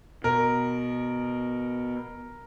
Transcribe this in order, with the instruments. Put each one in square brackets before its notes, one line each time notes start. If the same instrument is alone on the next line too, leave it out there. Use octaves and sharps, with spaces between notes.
[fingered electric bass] B2 [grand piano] A#4